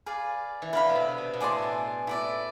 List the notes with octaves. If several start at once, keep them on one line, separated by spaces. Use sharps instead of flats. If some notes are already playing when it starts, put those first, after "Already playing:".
G#4 B4 D5 F5
E3
D3 B4 F5 B5
B2
C3
B2
B2
A2 G#4 D5 A5 C6
B2
A2 E4 B4 D5